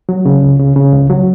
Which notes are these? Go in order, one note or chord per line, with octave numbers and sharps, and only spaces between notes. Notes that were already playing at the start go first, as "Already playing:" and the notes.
F#3
C#3
C#2
C#3
C#3
C#2
F#3